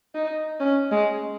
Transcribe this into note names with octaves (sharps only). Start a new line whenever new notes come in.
D#4
C#4
G#3